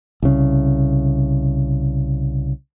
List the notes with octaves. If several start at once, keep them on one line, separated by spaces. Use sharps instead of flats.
C2 C#3